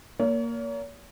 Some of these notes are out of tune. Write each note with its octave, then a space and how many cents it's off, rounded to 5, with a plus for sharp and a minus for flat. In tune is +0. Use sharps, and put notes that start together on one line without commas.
A#3 +0 C#5 +40